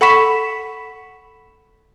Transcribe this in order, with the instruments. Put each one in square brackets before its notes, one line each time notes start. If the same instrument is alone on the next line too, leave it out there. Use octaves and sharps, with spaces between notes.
[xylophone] A4 F#5 B5 C#6 B6 E7